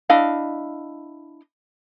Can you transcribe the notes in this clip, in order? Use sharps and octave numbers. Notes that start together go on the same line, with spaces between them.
D4 E4 D#5 F5